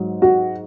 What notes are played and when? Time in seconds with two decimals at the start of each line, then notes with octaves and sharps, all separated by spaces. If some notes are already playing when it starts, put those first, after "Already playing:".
Already playing: G#2 F#3
0.22 F#4